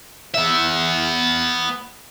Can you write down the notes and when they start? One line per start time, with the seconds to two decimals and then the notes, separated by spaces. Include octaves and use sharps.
0.35 B3 E5